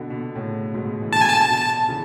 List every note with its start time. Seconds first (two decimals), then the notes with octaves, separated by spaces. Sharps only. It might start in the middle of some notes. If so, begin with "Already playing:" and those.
Already playing: B2 D3
0.10 B2 D3
0.35 A2 C#3
0.74 G#2 B2
1.01 E3
1.12 B2 D3 A5
1.21 G#5
1.29 A5
1.50 B2 D3
1.89 C#3 E3